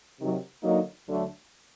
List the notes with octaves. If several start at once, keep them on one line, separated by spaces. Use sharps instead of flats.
C3 D#3 F#3
D3 F#3 A#3 D#4
D2 D3 F#3 A3